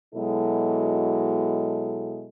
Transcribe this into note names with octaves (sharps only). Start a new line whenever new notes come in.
B2 F#3 G#3 E4 A4